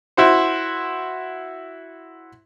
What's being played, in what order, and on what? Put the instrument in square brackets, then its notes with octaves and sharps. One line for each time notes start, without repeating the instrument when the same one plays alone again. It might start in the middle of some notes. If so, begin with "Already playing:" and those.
[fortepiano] E4 F#4 C5